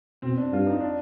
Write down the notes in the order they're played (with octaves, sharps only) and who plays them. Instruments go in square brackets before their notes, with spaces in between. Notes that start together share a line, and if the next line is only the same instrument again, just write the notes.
[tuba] B2 [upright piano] C4
[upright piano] D4
[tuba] G2 [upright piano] F4
[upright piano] D#4
D4